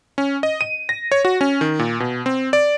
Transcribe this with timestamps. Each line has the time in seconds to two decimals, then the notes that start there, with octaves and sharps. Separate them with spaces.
0.18 C#4
0.43 D#5
0.61 D#7
0.89 A#6
1.12 C#5
1.25 F#4
1.41 C#4
1.61 D#3
1.79 A#2
2.00 B2
2.26 C4
2.53 D5